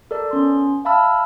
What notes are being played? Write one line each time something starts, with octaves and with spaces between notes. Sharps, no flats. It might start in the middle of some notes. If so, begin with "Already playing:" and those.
A4 A#4 D5
B3 C#4 C6
E5 F5 A5 B5 E6 F6